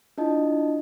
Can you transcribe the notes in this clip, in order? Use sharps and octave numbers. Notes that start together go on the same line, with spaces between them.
D4 E4 F4 D#5 A5